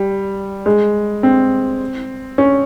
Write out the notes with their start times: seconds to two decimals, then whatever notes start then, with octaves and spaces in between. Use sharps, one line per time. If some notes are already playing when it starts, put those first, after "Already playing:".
Already playing: G3
0.66 G#3
1.23 C4
2.38 C#4